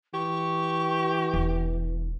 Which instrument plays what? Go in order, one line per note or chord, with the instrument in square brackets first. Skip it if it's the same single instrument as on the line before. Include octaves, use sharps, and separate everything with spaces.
[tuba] E3 [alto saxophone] G4 [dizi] C#6
[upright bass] E1